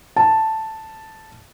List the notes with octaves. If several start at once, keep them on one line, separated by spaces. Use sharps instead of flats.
A5